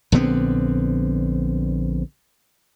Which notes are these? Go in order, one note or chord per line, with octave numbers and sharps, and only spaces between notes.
A#1 D3 B3 C4